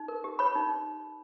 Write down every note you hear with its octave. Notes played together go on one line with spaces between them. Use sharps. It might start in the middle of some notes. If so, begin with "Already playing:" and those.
Already playing: D#4
A#4
G4
C#5 B5
D#4